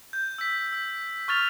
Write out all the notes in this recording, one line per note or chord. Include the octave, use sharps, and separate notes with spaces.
G6
E6 B6
E6
C#6 F6 A6 F7